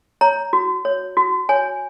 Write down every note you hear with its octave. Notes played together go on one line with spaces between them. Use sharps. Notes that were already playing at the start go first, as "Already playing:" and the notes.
C#5 A#5
F#4
C#5
F#4
C#5 G#5